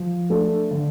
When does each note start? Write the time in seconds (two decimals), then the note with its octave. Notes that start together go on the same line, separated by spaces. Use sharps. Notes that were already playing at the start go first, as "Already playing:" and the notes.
Already playing: F3
0.30 A3 D4 A4
0.71 D3